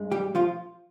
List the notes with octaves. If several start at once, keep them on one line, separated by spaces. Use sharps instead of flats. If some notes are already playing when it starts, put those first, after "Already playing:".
Already playing: G2 G#3
G3 G4
F3 F4